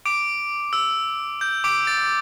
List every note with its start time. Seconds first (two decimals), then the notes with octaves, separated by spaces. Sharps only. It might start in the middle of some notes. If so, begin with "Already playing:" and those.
0.06 D6 D7
0.73 E6
1.41 G6
1.64 D6 D7
1.87 A6